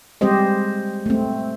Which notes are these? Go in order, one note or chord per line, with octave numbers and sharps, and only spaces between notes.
G3 G#3 C4 G4 C5 D#5
A3 C4